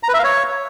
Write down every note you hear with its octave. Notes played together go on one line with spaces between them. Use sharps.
A#5
B4
E5
F5
C#5